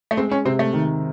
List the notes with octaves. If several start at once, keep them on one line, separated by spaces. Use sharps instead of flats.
A3
G#3 C4
C#4
C3 C4
A3
D#3